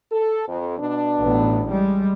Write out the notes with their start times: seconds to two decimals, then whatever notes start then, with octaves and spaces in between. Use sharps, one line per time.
0.12 A4
0.48 F2
0.79 B2 D4
1.19 A1 A2 B3
1.69 G3 G#3